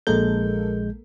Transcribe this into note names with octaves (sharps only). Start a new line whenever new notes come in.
A#1 G#3 A#3 A4 A#4 G6